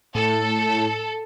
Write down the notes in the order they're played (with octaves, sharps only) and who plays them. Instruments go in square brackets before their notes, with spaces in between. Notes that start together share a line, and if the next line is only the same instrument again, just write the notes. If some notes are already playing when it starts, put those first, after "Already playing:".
[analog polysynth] A2 [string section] A4